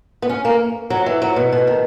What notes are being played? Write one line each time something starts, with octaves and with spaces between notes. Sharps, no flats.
B3
C#4
A#3
F#3
E3
F#3
B2
B2
D#3